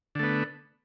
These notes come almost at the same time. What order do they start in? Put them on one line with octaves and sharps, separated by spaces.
D3 A3 B3